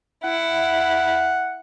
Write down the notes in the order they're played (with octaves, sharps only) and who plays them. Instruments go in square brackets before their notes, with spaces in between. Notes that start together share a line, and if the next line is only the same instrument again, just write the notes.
[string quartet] E4 [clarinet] F#5